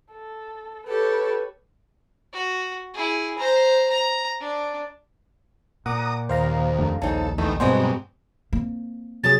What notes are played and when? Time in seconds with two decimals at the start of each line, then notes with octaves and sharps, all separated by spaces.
0.13 A4
0.88 G4 A4 B4 C#5
2.33 F#4
2.94 E4 G#4
3.38 C5 A#5
3.90 A#5
4.40 D4
5.86 A#2 F#5 A#5 D6 D#6
6.29 D#2 C5 F5 A#5
6.78 F2 A3 D4
7.02 A#1 D#2 C#3 D#4 A4
7.38 E2 D#3 A3 D#4
7.60 G2 B2 F#3 G#3 C4 C5 D#5
8.53 A#3 C4
9.24 C3 F#3 G#4 A6